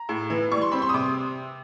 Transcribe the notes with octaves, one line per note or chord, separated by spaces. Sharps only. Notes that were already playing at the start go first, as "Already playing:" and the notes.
Already playing: A#5
A2
E3
G3 C#6
C6
C4 B5
C6
D#6
C3 D6